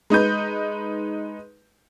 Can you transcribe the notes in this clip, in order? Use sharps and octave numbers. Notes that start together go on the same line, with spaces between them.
G#3 D#4 B4 G6